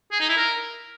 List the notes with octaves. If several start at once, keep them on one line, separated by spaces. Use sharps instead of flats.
G#4
D#4
E4
A#4